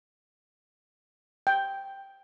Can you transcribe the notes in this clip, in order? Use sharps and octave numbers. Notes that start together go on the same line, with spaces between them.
G5